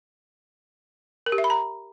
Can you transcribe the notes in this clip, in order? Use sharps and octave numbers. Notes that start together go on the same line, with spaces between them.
A#4
G4
E5
B5
A#5